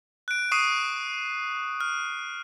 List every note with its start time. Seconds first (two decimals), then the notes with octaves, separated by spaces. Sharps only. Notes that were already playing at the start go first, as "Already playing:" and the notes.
0.28 F#6 D7
0.52 C#6 D#6 C7 D#7
1.81 F6